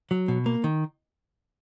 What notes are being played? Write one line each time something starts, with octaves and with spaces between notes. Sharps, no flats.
F#3
B2
A#3
D#3